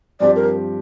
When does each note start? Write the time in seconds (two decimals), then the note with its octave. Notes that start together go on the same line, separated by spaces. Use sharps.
0.20 G2 F3 C4 G4 D5
0.36 A#4